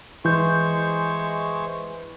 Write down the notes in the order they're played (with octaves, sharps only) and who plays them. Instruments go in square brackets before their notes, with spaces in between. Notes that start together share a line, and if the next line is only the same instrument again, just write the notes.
[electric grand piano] E3 G6 [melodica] G#3 C5 C#6